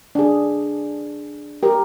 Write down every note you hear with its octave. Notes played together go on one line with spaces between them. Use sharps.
D4 G#4
G4 A#4